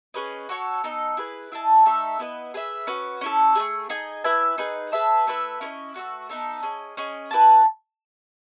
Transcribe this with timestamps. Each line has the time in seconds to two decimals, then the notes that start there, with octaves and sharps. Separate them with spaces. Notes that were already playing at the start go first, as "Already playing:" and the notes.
0.14 C#4 G#4 B4 D#5
0.49 F#4 A4 C#5
0.83 B3 D#4 A4 D#5
1.17 E4 G#4 B4
1.52 E4 G#4 D#5 A5
1.86 A3 D#4 A4 E5
2.19 B3 E4 B4 D#5
2.54 G#4 B4 E5
2.87 C#4 F#4 B4
3.21 C#4 E4 A4
3.55 E4 G#4
3.60 A3
3.89 D#4 G#4 D#5 G#5
4.24 E4 B4 E5 G#5
4.58 D#4 G#4 B4
4.92 G#4 B4 E5 A5
5.27 A3 E4 B4 E5
5.61 C#4 E4 B4 D#5
5.94 A3 C#4 F#4 B4
6.29 B3 D#4 A4 E5
6.63 C#4 G#4 D#5
6.97 C#4 G#4 D#5
7.31 E4 B4 D#5 A5